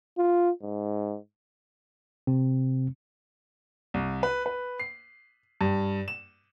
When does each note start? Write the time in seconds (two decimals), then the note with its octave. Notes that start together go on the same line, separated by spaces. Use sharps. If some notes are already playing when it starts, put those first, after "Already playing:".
0.18 F4
0.63 G#2
2.27 C3 C4
3.94 C2
4.23 B4
4.46 B4
4.80 C7
5.61 G2
6.08 E7